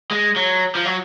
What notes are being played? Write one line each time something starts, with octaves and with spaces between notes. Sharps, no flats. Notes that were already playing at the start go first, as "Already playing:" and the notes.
G#3
F#3
F3
F#3